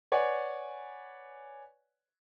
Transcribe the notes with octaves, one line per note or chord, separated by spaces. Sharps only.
B4 C#5 D5 F#5 G#5